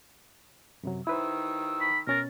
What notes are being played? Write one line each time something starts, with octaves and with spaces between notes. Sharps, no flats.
F#2 C3 F#3
D#3 E4 B4 C5 E6
B5
B2 C#4 A#4 A6